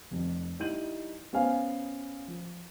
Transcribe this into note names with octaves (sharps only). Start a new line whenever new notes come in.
F1 F2
G3 D#4 E4 G6 D#7 F#7
B3 C#4 C5 F5 G#5
F3